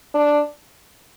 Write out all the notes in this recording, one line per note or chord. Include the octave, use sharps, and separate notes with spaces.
D4